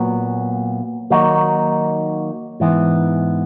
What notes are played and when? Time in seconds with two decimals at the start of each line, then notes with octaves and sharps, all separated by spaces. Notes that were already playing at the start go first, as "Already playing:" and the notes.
Already playing: A#2 F#3 B3
1.10 D#3 F#3 A#3 D#4 F#4
2.60 G#2 E3 B3